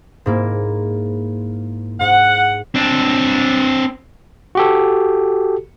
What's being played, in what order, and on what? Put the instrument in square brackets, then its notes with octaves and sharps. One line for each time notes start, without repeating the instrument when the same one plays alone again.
[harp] G#2 A#3 E4
[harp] G#2 [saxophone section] F#5
[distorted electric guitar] C4 D4
[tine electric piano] F#4 G4 A4